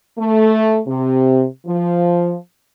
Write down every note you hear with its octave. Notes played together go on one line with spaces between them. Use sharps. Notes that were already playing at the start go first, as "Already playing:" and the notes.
A3
C3
F3